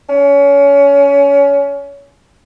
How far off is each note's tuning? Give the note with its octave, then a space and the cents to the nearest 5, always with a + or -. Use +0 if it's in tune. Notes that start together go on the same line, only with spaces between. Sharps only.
C#4 +25